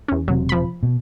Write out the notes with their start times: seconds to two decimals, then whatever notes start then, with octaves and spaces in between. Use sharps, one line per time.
0.08 E2 C#4
0.28 E1 C3 F#3
0.49 F3 B5
0.83 B2